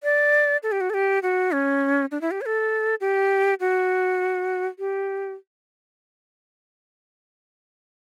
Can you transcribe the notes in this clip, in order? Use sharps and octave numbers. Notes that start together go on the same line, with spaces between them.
D5
A4
G4
F#4
A4
G4
F#4
C#4
D4
E4
G4
C#5
A4
G4
F#4
G4